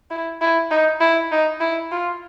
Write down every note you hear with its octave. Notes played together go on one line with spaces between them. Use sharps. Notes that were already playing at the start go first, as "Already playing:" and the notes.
E4
E4
D#4
E4
D#4
E4
F4